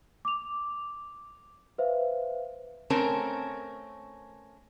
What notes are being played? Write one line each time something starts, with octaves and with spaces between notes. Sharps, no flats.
D6 F7
B4 C5 E5 F5
A3 C4 C#4 A#4